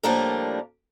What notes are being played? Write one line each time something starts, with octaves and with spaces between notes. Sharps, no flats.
A2 F3 G3 A#3 D4 A#4